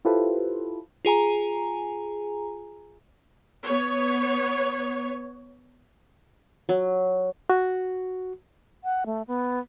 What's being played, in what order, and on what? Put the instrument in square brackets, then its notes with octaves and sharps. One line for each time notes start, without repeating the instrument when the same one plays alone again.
[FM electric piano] E4 F4 G4 A4 B4 C5
[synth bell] F4 G#4 G#5 A#5
[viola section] B3 C#5
[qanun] F#3
[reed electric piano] F#4
[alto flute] F#5
A3
B3